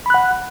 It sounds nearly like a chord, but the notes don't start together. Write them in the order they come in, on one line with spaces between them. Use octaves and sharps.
B5 F#6 F#5